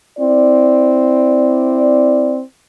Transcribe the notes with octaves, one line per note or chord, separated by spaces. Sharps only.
C4 E4 D5